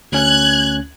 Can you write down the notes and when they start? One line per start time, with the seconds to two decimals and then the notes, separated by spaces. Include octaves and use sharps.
0.12 D2 C#4 F#6 G#6